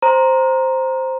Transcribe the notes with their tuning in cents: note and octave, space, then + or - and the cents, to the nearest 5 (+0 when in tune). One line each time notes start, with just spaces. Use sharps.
C5 +0 A#5 +5